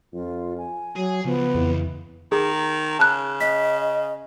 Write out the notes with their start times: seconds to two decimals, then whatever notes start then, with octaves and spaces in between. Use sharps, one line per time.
0.13 F2 F4
0.58 G#5
0.96 F#3 G#4
1.25 C#2 F3 B3
1.55 F2 E3
2.32 D#3 G#4
2.99 C#3 A5 F#6
3.41 D#5 B6